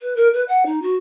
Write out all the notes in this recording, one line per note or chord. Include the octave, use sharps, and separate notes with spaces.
B4
A#4
B4
F#5
D#4
F#4